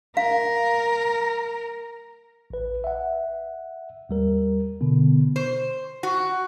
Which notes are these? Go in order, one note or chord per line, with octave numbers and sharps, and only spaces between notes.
A#4 F5
A1 B4
E5 F#5
D#2 G3 A#4
B2 D3 B3
C5
F#4